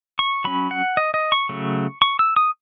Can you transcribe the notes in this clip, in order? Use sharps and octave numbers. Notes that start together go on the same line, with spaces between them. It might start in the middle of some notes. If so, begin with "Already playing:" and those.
C#6
F#3 C#4 B5
F#5
D#5
D#5
C#6
C#3 F#3 A3
C#6
E6
D#6